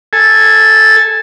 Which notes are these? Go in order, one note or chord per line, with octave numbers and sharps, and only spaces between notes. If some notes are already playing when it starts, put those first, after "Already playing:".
A4 G#5